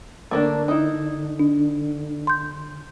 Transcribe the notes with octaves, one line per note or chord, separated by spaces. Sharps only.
D3 A3 A#3 D4
D#4 E4
D4
C6 G6